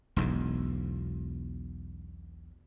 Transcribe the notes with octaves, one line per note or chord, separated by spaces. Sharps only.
E1 B1 E2